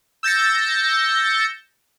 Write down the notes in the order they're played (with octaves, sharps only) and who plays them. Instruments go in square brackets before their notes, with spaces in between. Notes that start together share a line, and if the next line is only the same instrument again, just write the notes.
[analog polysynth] E6 G6 A6 A#6 C#7